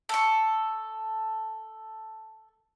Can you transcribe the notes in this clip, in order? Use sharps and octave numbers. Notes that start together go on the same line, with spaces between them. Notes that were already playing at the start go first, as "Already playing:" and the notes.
A4 C#6